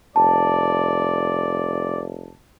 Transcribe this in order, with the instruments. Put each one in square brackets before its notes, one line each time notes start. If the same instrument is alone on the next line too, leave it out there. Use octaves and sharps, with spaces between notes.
[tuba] F1 [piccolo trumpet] D5 [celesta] A5